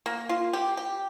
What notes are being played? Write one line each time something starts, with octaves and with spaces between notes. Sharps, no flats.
A#3
F4
G4
G4